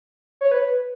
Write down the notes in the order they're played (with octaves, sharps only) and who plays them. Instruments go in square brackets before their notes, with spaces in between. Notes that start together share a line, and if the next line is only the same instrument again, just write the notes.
[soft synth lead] C#5
B4